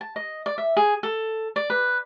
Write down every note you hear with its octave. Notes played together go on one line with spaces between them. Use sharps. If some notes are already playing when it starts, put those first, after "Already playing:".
A5
D#5
D5
E5
G#4
A4
D5
B4